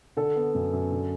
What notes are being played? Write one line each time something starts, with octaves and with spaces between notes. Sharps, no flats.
D3 A4
B3
F#2
F#2
D3